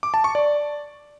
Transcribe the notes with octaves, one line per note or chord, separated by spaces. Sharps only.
D6
A5
C#6
D5